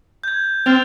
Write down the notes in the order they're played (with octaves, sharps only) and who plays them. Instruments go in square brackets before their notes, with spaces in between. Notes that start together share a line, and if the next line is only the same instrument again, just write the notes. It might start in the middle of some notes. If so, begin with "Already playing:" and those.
[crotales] G6 G#6
[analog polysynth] C4 [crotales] F6 A6 F7